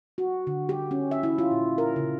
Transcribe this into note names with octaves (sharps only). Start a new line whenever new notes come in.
F#4
D3
G4
C#4
E5
E4
F4
A#2
A#4
C#3